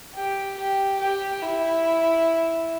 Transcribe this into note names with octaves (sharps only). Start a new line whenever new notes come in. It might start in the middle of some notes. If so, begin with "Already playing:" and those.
G4
G4
G4
E4